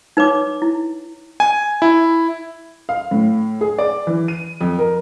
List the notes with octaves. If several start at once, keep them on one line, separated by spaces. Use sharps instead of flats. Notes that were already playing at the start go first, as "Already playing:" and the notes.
D#4 B4 C#5 D6
E4
G#5
E4
F5
A2
G#4
D5
E3
D#7
F2
A#4